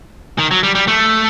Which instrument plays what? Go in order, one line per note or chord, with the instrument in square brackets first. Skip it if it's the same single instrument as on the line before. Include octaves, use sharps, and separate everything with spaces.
[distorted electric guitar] D#3
F#3
G3
G3
A3